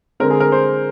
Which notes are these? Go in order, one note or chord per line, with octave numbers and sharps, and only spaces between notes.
D3 G#3 C4 A#4
G#4
A#4
C5